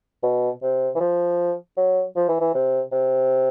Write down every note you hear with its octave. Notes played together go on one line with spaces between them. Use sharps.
B2
C3
E3
F3
F#3
F3
E3
E3
C3
C3